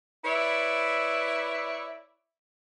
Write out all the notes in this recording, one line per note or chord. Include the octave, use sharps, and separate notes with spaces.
E4 B4 C#5 D5 E5